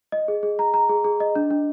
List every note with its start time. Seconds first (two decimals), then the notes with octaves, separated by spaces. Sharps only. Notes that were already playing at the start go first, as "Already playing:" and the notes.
0.12 D#5
0.28 G#4
0.43 G#4
0.59 A#5
0.74 A#5
0.89 G#4
1.04 G#4
1.20 D#5
1.35 D4
1.51 D4